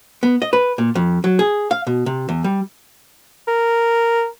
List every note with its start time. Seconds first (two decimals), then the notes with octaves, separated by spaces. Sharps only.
0.23 B3
0.42 D#5
0.53 B4
0.78 A#2
0.95 F2
1.24 F#3
1.39 G#4
1.71 F5
1.87 B2
2.06 C3
2.29 E2
2.44 G3
3.48 A#4